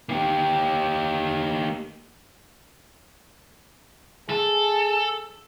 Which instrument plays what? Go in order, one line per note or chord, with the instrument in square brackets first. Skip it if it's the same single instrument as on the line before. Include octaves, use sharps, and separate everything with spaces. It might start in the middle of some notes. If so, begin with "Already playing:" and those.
[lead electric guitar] A#3 G4
[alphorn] G#4 [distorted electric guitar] A4